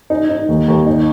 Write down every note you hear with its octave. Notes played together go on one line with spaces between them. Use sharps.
D#4
D#4
D#2
D#2
D#4